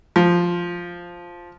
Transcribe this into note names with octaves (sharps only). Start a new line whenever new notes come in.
F3